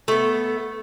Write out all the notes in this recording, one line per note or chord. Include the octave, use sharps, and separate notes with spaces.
A3 B3